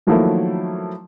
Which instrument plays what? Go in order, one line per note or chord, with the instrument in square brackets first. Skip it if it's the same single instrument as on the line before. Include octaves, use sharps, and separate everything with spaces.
[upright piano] D#3 F3 F#3 A3 A#3 E4